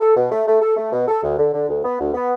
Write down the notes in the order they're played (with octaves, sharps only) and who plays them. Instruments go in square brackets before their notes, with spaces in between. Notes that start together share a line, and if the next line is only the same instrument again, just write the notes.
[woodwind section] A4
B2
A3
A3
A4
A3
B2
A4
D2
D3
D3
D2
B3
D2
B3